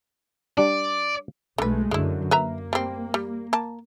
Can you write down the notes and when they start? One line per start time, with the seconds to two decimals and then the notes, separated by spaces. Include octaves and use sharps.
0.58 G3 D4 D5
1.58 B1 D3 G#3 A3 B4
1.91 F#2 D3 G#3 E4
2.31 A#3 B4 E5 A#5
2.73 G3 C4
3.14 G3
3.53 A#3 A5